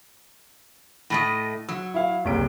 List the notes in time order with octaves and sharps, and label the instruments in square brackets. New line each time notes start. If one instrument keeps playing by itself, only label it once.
[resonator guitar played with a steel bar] A2 A3 D#5
[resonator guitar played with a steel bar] F#3 [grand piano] E6
[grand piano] E4 F5
F#1 C2 D7